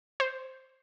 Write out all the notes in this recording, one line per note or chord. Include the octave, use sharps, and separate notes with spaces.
C5